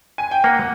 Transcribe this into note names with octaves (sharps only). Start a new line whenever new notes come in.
G#5
G5
A#3 F#5